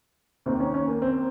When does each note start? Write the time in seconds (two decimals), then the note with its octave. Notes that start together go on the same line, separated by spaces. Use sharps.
0.46 D#2 D#3 C4
0.60 C#4
0.74 C#4
0.88 A#3
1.02 C4